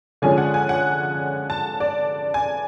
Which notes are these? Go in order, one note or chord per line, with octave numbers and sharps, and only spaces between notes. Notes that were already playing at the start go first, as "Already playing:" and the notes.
D3 F3 G#3 C#4 G#5
F#5
G#5
F#5
A5
D5
G#5